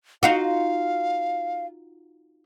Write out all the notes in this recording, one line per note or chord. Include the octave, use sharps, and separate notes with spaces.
D#4 F4 F#4 F5